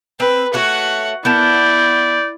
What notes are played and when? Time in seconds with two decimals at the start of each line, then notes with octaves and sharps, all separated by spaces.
0.20 C4 B4
0.54 A3 F#4 C#5 F#5
1.25 B3 E4 A#4 D5 A5 G6